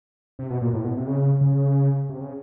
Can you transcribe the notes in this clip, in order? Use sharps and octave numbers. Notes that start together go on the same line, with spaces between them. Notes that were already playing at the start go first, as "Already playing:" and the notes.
C3
B2
A#2
A2
B2
C3
C#3
C#3
C3
C#3